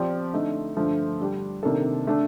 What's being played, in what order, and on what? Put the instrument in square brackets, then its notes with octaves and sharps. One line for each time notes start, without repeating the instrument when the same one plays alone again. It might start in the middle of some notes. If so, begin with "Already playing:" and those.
Already playing: [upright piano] F3 C4 G4 D5
D3 A3 D#4
G2 D3 F3 A3
D3 G3 D4 G4
C3 D#3 A#3 D4 A4
D3 A3 D4 A4